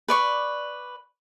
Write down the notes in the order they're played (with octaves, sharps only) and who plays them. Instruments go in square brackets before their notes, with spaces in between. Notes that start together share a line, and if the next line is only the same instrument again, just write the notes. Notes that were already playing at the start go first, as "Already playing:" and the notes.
[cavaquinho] B4 D5 C#6